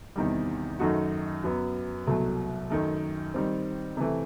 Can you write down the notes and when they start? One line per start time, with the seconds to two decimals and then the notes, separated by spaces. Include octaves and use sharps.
0.16 E2 C3 D#3 G3
0.79 F#2 D#3 A3 D#4 F#4
1.43 F#2 F#3 B3
2.06 C2 B2 F#3 A3
2.70 F#2 D#3 A3
3.34 D#3 G3 C4
3.97 C3 E3 A3